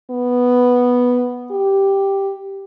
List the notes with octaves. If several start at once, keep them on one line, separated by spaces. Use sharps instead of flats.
B3
G4